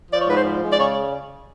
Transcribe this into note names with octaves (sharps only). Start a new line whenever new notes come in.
F3 D5
C#5
G#2 B4
C5
F3
G#3
D5
C#3 C#5